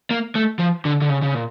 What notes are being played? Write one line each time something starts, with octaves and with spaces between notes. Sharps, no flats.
A#3
A3
F3
D3
D3
C#3
C#3
A#2